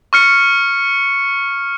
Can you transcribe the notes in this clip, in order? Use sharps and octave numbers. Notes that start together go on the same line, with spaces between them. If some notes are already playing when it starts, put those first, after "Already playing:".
C#6 F6 C#7